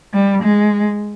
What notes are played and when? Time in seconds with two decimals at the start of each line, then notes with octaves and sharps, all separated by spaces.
0.13 G3
0.43 G#3